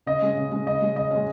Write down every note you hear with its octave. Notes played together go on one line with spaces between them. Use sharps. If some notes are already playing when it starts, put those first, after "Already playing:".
C#3 D#5
G#3 C#4
C#3
G#3 C#4
C#3 D#5
G#3 C#4
C#3 D#5
C#4
G#3